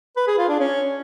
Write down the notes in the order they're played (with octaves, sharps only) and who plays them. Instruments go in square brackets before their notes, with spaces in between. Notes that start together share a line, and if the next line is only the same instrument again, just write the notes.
[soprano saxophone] B4
G#4
F4
D4
C#4